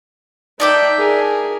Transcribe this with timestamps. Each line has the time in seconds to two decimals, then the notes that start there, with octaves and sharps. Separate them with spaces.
0.60 D4 D#4 D5 E5 G5
0.98 G#4 A#4